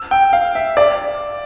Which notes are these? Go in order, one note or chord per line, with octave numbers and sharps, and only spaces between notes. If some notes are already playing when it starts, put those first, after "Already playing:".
Already playing: E6
G5
F5
E5
D5